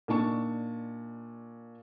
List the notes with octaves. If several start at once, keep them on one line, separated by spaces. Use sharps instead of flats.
A#2 D4 D#4 A5 C#6